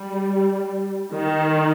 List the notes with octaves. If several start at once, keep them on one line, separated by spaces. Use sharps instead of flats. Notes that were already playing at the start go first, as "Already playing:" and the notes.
Already playing: G3
D#3